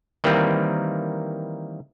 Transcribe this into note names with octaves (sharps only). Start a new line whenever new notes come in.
D#3 E3 G3 A#3 C4 B4